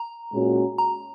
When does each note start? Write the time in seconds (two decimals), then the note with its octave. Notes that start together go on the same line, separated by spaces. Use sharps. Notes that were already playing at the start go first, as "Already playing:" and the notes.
Already playing: A#5
0.32 A#2 G#3 C#4 F#4
0.78 A#5